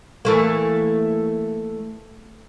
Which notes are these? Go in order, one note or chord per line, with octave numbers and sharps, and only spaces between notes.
E3 A3 A#3